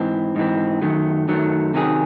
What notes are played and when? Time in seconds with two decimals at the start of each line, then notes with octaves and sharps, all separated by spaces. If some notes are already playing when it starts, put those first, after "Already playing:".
Already playing: G#2 E3 C4
0.36 G#2 E3 C4
0.82 F#2 D#3 F#3 A3
1.28 F#2 D#3 F#3 A3
1.74 C3 D#3 F#3 C#4 G#4